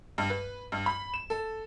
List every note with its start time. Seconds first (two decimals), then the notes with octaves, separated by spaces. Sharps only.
0.18 G2
0.30 B4
0.72 G2
0.86 B5
1.14 E7
1.30 A4